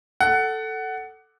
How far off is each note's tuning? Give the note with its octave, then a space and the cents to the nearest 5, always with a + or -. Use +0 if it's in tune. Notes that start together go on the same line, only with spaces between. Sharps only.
A4 +0 F#5 +15